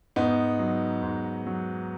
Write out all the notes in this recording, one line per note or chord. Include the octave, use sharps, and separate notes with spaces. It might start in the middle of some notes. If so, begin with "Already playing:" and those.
G#2 B3 D#4
F#3
G#2
F#3